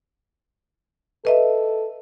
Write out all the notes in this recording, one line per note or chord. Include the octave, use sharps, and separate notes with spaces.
A4 B4 D#5 E5